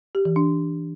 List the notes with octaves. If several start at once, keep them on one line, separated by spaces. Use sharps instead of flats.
G4
E3
D4